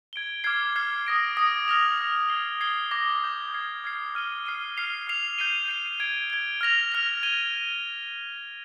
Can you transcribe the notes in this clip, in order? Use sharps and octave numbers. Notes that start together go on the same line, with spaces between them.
G#6 D7 G7
D6 F6 G#6 C7
D6 F6 G#6 C7
D#6 A#6 D7
D#6 A#6 D7
F6 A#6 F7
F6 A#6 F7
G#6 C7 G7
G#6 C7 G7
D6 G6 A#6
D6 G6 A#6
F6 G#6 C7
F6 G#6 C7
F6 C7 D#7 G7
F6 C7 D#7 G7
F6 C7 F7
F6 C7 F7
G6 C7 D#7 G7
G6 C7 D#7 G7
G#6 D7 G7
G#6 D7 G7
F6 A#6 F7
F6 A#6 F7
G#6 D#7 G7